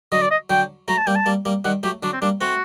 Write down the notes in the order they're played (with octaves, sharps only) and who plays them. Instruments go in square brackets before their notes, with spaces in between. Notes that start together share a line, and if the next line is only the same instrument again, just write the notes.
[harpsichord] D3 F#3 [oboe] D#5
[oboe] D5
D#5
[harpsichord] D3 F#3 [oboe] G5
[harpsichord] F#3 A3 [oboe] A#5
[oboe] A5
[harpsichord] G3 A#3 [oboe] G5
[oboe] A5
[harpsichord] G3 A#3
G3 A#3
[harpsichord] D#3 G3 [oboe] F#5
[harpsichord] F#3 A3 [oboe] G4
[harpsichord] D3 F#3 [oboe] D4
[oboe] C4
[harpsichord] G3 A#3 [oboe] D4
[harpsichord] A3 C4 [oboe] F#4